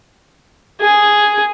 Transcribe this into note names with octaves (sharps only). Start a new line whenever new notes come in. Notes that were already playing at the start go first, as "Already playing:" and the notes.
G#4